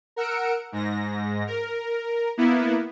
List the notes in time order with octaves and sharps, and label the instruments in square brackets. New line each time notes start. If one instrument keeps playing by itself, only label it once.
[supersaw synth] A#4 F#5 E6 C#7 D7
G#2 A#6
A#4
A#3 B3 E4